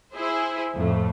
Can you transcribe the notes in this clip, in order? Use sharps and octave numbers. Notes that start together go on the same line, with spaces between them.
E4 G#4 C5
F2 A2 A3